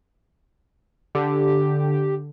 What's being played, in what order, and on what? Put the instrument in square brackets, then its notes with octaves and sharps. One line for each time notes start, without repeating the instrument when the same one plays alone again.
[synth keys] D3 [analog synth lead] G4